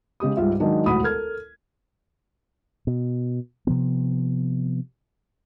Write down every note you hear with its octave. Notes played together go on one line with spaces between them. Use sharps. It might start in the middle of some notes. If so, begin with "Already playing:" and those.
C#3 G#3 G4 D#6
C#2 G#2 G3 F4 E5
D#3 F#3 G#3 D4 D#4
E1 A1 D2 F#4 B5 D#6
A4 A#4 F6 G#6
B2
C3 F3 B3